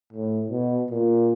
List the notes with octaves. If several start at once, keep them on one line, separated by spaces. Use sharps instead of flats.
A2
B2
A#2